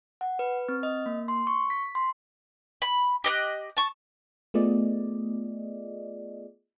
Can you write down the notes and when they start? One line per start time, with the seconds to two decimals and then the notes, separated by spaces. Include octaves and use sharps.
0.21 F#5
0.39 B4
0.69 C4
0.83 D#5
1.06 A#3
1.28 C6
1.47 C#6
1.70 B6
1.95 C6
2.82 B5
3.24 G4 D#5 F#6
3.77 A5 C#6
4.54 A3 B3 F4 G#4 D5 D#5